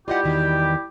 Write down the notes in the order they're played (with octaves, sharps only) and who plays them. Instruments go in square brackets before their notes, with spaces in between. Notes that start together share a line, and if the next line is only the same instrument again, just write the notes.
[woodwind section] G3 E4 G4 [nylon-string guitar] F4 D#5 F#5
[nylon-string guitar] E2 D#3 F#4